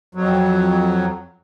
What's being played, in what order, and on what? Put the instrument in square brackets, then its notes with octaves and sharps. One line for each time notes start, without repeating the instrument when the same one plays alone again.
[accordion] F2 F#3